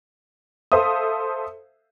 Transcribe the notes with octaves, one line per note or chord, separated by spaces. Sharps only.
A4 C5 E5 F5 D#6